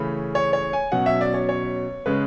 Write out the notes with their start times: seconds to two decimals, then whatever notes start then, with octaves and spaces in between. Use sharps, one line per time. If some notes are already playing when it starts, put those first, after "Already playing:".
Already playing: C#3 E3 A3 C#4 B5
0.35 C#5
0.53 C#5
0.73 G#5
0.92 B2 F#3 C#4 F#5
1.06 E5
1.21 D5
1.34 C#5
1.49 C#5
2.06 C#3 G#3 C#4 B4